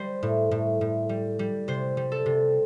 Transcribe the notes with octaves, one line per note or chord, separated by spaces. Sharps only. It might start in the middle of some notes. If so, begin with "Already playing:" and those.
Already playing: G3 C5
A2
A2
A2
G3
G3
C3 C5
G3
A4
C3